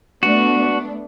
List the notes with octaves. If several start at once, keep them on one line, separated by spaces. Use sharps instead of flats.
A3 B3 D4 F#4